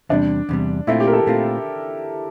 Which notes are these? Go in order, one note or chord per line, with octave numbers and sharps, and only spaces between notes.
E2 C3 G3 D4
E2 C3 G3
A#2 A3 C4 E4 F4
G4
A#4
A4
A#2 A3 C4 F4